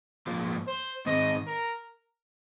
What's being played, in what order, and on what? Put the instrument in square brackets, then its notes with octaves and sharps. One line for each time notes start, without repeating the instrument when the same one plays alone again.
[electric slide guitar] G#2 F3 A#3 F4
[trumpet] C5
[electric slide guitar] G#2 D#3 C4 [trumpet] D#5
[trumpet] A#4